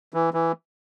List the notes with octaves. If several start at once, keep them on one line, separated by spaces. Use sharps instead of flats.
E3
E3